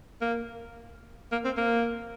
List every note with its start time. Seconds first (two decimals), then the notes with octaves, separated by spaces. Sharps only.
0.21 A#3
1.32 A#3
1.45 C4
1.57 A#3